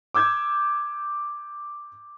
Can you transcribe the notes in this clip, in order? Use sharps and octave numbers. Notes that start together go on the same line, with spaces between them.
D6 E6 G6 G#6